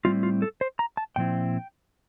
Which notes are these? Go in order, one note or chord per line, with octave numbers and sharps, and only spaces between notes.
A2 G3 C4 E4 F4
F4
A4
C5
A#5
A5
A#2 F3 C4 E4 G5